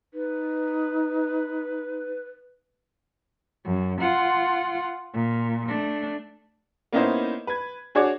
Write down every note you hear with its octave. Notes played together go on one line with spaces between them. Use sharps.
D#4 B4
F#2
F4 F#5
A#2
A3 D4
A#3 B3 C#4 D#4 E4 C5
B4 G#6
D4 F#4 G#4 C#5 D6 G#6